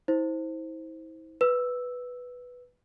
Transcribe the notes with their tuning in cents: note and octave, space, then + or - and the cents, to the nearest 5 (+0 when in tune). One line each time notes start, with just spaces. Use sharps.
E4 -40 C5 +0
B4 +0 E6 +0